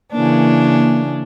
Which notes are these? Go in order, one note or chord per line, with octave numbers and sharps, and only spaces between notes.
C#3 E3 A#3 D4